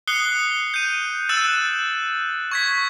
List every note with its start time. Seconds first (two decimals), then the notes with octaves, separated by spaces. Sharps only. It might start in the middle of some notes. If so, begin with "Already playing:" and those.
0.07 D#6 F#6 C7 C#7 G7
0.74 G6 D#7
1.29 E6 F#6 A6 D7 E7
2.52 C#6 G#6 B6